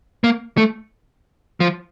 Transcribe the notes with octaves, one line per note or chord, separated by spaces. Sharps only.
A#3
A3
F3